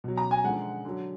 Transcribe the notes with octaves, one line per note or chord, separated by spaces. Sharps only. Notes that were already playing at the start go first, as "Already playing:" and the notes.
B2 F#3
A#5
G#5
D3 F3 G#3 F#5
D3 F#3